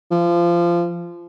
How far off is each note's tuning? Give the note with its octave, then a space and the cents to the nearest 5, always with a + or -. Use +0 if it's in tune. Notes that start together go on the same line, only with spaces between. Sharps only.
F3 -20